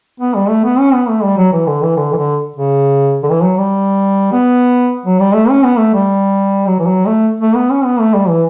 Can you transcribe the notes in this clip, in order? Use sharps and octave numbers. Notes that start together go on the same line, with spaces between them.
B3
G3
A3
B3
C#4
B3
A3
G3
F#3
E3
D3
E3
D3
E3
D3
C#3
D3
E3
F#3
G3
B3
F#3
G3
A3
C#4
B3
A3
G3
F#3
E3
F#3
A3
A3
B3
C#4
B3
A3
G3
E3